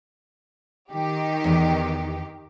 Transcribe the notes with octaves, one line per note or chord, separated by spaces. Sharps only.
D#3 G4
E2 B3